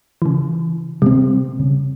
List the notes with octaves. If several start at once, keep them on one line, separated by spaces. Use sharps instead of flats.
C#3 E3
C3 G3 C4
C#3